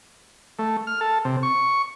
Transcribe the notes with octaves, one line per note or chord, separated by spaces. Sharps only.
A3
F6
A4
C3
C#6